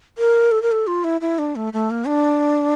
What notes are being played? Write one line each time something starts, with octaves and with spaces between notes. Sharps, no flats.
A#4
A4
A#4
A4
F4
E4
E4
D4
A3
A3
A#3
D4